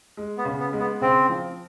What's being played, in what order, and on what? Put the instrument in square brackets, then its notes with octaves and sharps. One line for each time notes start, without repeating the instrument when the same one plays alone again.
[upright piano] G#3
[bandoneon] B3
[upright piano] C#3
[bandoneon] B3
[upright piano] G#3
[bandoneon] B3
[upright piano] C#3 [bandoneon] C4
[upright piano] F3